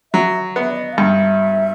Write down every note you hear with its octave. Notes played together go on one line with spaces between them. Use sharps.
F#3 E5
B3 E5
D5
D#5
F5
G2 E5